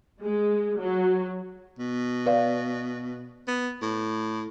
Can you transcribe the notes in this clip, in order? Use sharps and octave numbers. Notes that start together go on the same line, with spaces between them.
G#3
F#3
B2
B4 D5 F5
B3
A2